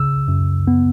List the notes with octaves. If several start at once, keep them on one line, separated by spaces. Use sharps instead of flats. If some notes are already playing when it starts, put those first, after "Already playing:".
Already playing: C#3 E6
F#2
B3